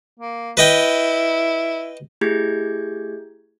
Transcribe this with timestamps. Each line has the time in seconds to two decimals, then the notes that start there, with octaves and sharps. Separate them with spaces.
0.20 A#3
0.57 E4 B4 D#5 G5
2.21 A3 E4 G4 G#4 G6 G#6